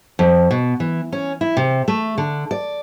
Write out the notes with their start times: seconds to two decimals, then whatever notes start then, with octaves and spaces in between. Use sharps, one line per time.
0.19 F2
0.51 B2
0.80 E3
1.12 C#4
1.41 E4
1.57 C3
1.88 A3
2.18 D3
2.51 D5